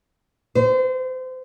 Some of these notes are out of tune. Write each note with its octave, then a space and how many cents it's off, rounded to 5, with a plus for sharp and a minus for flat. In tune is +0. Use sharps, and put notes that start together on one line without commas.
C5 -30